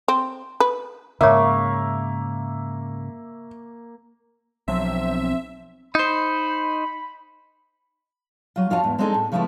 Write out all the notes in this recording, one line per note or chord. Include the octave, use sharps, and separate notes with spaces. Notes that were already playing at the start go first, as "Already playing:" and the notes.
C4
B4
G#2 C#3 A#3 A#4 C#5 E5 C#6
B1 F3 F#3 C4 E5
D#4 C5 B5
F#3 F4
F2 F4 F#4 C#5 G#5 A5
E2 G#2
G#3 C4 D4 D#4 G#4 A4
A2
C#3 F3 G#3 A3 B3 E4